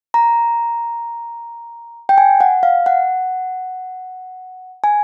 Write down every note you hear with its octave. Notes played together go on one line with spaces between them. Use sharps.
A#5
G5
G#5
F#5
F5
F#5
G#5